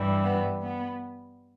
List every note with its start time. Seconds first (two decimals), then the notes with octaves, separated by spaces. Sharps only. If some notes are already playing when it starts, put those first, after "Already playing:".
Already playing: G2 E3 G3
0.23 B3
0.62 B3